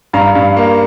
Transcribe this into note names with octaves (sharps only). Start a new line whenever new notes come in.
G2 F5 A#5
G2
A#3